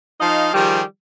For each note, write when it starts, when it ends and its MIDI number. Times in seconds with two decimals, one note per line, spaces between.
0.20 0.54 53
0.20 0.54 63
0.20 0.54 75
0.20 0.54 77
0.54 0.81 51
0.54 0.81 53
0.54 0.81 55
0.54 0.81 67
0.54 0.81 68